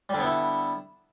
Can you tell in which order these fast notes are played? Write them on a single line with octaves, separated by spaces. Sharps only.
G3 D3 B3 E4